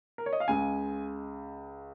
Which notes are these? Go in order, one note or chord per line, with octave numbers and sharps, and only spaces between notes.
A#4
C#5
D#5
F5
C#2 C#3 G#3 G#5